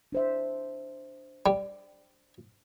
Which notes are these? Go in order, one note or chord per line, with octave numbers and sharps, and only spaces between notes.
D4 C5 E5
G3